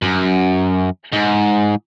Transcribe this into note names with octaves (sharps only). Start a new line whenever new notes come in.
F#2
G#2